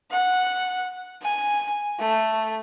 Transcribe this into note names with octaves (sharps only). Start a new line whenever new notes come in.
F#5
G#5
A3